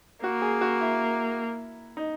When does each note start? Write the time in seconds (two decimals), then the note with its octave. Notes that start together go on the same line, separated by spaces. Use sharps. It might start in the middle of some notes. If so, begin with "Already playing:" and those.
0.24 A#3 F#4
0.42 G#4
0.61 F#4
0.81 E4
1.97 D#4